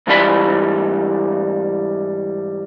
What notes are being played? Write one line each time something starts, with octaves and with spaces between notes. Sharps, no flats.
G#2 E3 G3 F4 G#4 B5